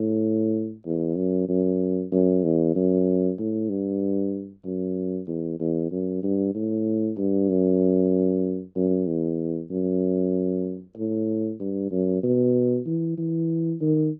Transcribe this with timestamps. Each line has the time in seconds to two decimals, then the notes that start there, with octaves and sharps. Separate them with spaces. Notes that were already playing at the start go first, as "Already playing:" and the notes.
Already playing: A2
0.86 E2
1.17 F#2
1.49 F#2
2.12 F#2
2.44 E2
2.75 F#2
3.39 A2
3.70 G2
4.65 F#2
5.28 E2
5.60 E2
5.92 F#2
6.23 G2
6.55 A2
7.18 G2
7.49 F#2
8.76 F#2
9.07 E2
9.71 F#2
10.97 A2
11.60 G2
11.91 F#2
12.23 B2
12.86 E3
13.18 E3
13.81 D#3